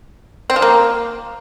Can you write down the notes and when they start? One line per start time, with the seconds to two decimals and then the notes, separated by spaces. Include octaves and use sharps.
0.50 C4
0.56 F3
0.62 A#3